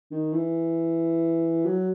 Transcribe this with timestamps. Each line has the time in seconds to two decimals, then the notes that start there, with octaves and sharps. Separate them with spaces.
0.11 D#3
0.33 E3
1.65 F#3